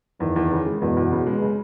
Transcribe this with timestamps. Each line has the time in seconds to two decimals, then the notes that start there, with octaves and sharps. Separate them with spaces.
0.20 E2 D#3
0.36 E2
0.51 C#3
0.66 G#3
0.82 E2 B2
0.97 E2
1.11 C#3
1.26 G#3
1.42 C#3